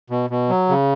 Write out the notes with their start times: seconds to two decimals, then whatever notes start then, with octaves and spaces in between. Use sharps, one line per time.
0.10 B2
0.30 B2
0.49 F#3
0.69 C#3